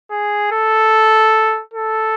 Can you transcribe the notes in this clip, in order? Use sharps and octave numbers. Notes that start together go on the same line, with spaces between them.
G#4
A4
A4